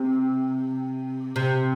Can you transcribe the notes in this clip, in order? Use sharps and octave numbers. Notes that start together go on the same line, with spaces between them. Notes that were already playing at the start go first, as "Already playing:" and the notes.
Already playing: C3
C3